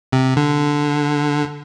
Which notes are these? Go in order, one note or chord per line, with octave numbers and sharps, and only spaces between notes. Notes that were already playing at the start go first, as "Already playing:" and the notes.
C3
D3